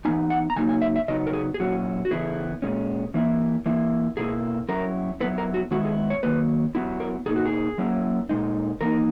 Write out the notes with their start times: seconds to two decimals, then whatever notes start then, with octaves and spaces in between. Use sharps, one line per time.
0.05 E3 B3 D#4 G#5
0.30 F#5
0.50 A#5
0.56 C#3 F#3 A#3 D#4 G#5
0.69 G#5
0.82 E5
0.96 E5
1.08 C#3 F#3 B3 D#4 D#5
1.27 A#4
1.33 G#4
1.54 G#4
1.60 A#2 F#3 C#4 E4 F#4
2.05 F#4
2.11 C#3 E3 B3 E4 G#4
2.62 A#2 G#3 C#4
3.14 E3 A#3 E4
3.66 E3 A#3 E4
4.17 B2 A#3 E4 G#4
4.69 F#3 C#4 E4 A#4
5.20 F#3 B3 E4 B4
5.38 A#4
5.54 F#4
5.71 D#3 G#3 B3 E4 F#4
5.85 G#4
6.10 C#5
6.23 D#3 F#3 A#3 B4
6.75 F#3 B3 E4
7.00 A#4
7.26 B2 A#3 D#4 G#4
7.36 F#4
7.45 G#4
7.78 F#3 A#3 C#4 E4
8.29 A#2 G#3 D#4
8.81 E3 A#3 D#4 A#4